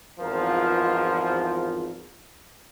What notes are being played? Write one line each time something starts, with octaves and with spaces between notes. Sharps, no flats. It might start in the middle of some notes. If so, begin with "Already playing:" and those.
G#1 E2 F3 F4 A#4